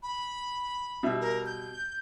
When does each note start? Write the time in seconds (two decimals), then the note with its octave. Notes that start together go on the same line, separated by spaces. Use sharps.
0.03 B5
1.03 B2 G3 E5
1.21 A#4
1.46 G6